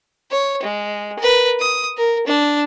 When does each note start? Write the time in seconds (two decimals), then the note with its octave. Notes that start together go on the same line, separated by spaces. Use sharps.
0.31 C#5
0.63 G#3
1.19 A#4 B4
1.60 D#6
1.97 A#4
2.27 D4